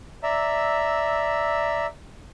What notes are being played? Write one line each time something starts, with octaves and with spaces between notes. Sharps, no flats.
D5 E5 A#5 E6